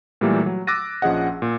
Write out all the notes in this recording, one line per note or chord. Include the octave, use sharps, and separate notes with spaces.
A#2 E3 F#3 G3 A3 A#3
F#3
D6 E6 F#6 A6 A#6 D#7
A#1 F3 C#4 G#4 D#5 F#5
A#2